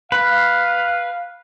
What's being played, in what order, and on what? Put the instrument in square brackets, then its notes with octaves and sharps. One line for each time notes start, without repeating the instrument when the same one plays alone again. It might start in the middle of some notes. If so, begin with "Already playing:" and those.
[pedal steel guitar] B4 [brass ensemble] F5